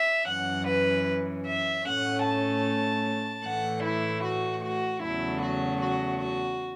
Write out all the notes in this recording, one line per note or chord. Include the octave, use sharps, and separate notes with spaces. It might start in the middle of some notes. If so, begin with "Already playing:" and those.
Already playing: E5
F#2 E3 C#4 F#5
B4
E5
A2 A3 C#4 F#5
A5
A2 E3 A3 F#5
E4
F#4
F#4
E2 C#3 F#3 A3 E4
F#4
F#4
F#4